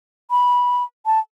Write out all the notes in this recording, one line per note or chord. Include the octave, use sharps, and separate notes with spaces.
B5
A5